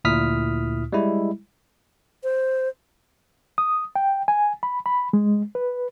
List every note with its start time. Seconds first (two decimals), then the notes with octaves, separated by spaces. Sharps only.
0.04 D2 A#2 E4 D#6 F6 B6
0.92 G3 G#3 E4
2.24 C5
3.58 D#6
3.96 G5
4.28 G#5
4.63 B5
4.86 B5
5.13 G#3
5.55 B4